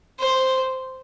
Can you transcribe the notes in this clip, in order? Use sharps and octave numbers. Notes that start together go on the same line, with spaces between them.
C5